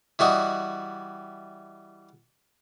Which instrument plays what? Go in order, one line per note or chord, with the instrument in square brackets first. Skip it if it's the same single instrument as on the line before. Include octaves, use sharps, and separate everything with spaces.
[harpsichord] E3 G3 F#4 D#5